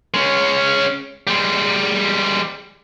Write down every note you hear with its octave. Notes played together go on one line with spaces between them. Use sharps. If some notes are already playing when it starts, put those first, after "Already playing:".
G#3 C#4
G3 G#3